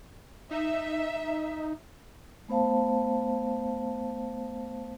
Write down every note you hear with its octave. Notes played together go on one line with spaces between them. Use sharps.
D#4 E5
A3 B3 C5 F5 A5